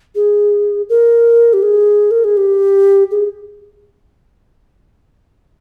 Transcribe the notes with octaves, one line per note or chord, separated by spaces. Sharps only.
G#4
A#4
G4
G#4
A#4
G#4
G4
G#4